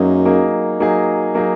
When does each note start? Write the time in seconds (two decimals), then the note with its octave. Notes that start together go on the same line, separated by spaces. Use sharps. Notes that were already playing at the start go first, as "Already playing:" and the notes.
Already playing: F#2 F#3 A#3 D#4 G#4
0.25 F#3 A#3 D#4 G#4
0.80 F#3 A#3 D#4 G#4
1.35 F#3 A#3 D#4 G#4